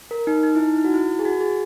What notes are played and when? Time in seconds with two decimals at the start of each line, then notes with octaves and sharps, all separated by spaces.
0.11 A#4
0.27 D#4
0.44 D#4
0.55 E4
0.59 D#4
0.76 E4
0.84 F#4
0.94 E4
1.19 G#4
1.25 F#4
1.41 G#4